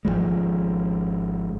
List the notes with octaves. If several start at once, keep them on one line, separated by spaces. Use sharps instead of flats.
G#1 C#2 F3 G#3